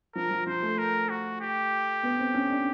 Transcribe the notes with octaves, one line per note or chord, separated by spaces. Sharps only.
F3 A#4
F3
F3 C5
A3
A#4
F#4
G4
B3
C4
C#4
D4